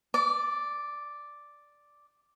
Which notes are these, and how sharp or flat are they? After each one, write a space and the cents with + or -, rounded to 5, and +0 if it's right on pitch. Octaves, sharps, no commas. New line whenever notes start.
D5 +0 D6 -35